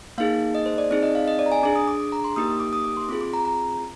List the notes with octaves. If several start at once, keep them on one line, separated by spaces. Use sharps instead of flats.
A#3 D#4 G#4 F5
D#5
C5
D5
C4 D#4 G#4 D5
D#5
F5
D#5
D5
A#5
G#5
D4 G#4 D6
D#6
D6
D6
A#5
C6
A#3 D#4 G4 D#6
D#6
D6
D#6
D6
C6
C4 F4 G#4 D6
D6
A#5
A#5